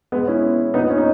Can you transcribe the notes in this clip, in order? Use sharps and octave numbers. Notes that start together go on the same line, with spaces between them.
B2 G#3 B3
C#4 E4
A#2 B3 D#4
C#4
D#4